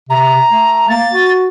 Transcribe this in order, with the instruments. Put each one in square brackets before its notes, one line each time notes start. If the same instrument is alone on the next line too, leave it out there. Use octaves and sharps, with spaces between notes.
[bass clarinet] C3 [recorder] A#5
[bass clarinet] A3
[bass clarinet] A#3 [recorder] A6
[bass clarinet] F#4